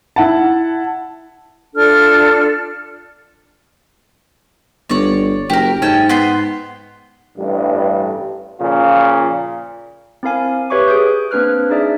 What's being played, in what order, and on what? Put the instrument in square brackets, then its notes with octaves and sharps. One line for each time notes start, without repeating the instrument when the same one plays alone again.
[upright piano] E4 F#5 A5
[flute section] D4 F4 A4 F6
[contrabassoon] G1 [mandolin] C#5 D5
[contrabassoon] F#1 [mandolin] G4 A#4
[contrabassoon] G#2 [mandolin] C#4 G5 A5
[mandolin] B3 C6 G6
[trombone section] A1 G2
A#2 C#3 F3 F4
[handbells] C4 E4 A#4 F5 G#5
G4 B4 C#5 E5 C#6 D6
G#4 D#6 G6
A#3 C4 D4 B4 F6 F#6
D4 D#4 G#4 D5 E5